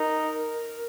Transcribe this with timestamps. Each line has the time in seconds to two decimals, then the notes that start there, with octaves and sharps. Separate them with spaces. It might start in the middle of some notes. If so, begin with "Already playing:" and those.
Already playing: D#4 A#4